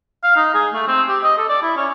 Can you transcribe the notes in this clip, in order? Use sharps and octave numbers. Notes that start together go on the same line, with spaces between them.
F5
D#4
G#4
A3
C4
G4
D#5
A4
D5
E4
C#4